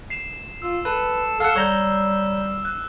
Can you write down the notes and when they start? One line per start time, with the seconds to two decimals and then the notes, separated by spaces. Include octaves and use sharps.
0.10 C7 E7 F7
0.62 F4 E6
0.85 A4 B4
1.40 A4 F5 F#5 E6 F6 E7
1.56 G3 C#5 A#5 G6
2.65 F#6